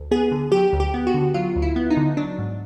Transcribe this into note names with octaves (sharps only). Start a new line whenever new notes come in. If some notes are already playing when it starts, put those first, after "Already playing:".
Already playing: D2
B3 G#4
D3
F#3 G4
D2
G4
B3
F#4
D3
F#3 F4
D2
E4
B3
D#4
D3
F#3 D4
G#2